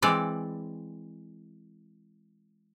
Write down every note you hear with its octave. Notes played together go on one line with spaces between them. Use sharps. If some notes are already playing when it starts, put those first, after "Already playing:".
E3 G#3 C4 B4 D5